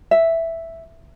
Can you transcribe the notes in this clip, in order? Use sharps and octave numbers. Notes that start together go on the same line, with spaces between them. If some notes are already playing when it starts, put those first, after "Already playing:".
E5